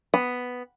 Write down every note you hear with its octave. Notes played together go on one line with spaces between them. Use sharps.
B3